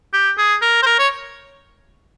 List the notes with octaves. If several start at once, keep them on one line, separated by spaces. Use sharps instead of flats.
G4
G#4
A#4
C5
A#4
C#5